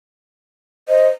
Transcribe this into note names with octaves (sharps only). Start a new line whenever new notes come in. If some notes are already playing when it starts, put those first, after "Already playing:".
C5 D#5